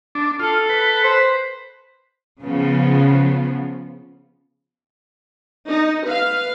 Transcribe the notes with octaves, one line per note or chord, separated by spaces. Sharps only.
D4
F4 A4
B4
C5
C#3 F3 B3
D#4
B4 F5